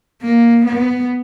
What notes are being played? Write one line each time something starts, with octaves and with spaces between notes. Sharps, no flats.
A#3
B3